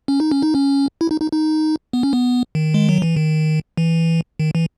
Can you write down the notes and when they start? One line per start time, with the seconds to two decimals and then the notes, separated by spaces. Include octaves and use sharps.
0.08 C#4
0.20 D#4
0.31 C#4
0.42 D#4
0.55 C#4
1.01 E4
1.11 D#4
1.21 D#4
1.32 D#4
1.93 B3
2.03 C#4
2.13 B3
2.55 D#3
2.74 G#3
2.89 F#3
3.02 E3
3.16 D#3
3.77 E3
4.39 D#3
4.55 E3